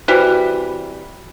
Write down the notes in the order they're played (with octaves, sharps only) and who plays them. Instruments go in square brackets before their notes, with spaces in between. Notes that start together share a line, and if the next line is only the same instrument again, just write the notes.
[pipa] C3 E3 G3 [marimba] F#4